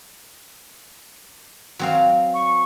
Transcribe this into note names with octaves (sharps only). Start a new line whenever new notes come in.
F#3 C4 F5
C#6